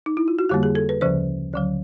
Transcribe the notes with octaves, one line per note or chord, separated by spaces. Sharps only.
D#4
E4
F4
F#4
F2 D3 G3 A#3 G4
G#4
A4
B4
D2 C#3 F3 C5
D2 D3 F#3